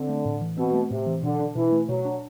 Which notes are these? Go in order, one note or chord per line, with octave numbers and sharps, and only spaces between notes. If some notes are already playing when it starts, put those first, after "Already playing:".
Already playing: D3 C4
A3
A2
E3
B2 C4
A3
A2 C3
E3
B2 D3
D4
B2 E3
A3
B2 F#3
D4